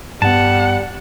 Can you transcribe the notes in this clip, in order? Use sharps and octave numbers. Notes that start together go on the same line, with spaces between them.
G2 G3 B3 F#5 A5